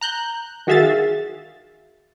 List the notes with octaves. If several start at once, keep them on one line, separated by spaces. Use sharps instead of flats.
A#5 F#6 G6
D#3 F#4 G#4 E5 F5 A6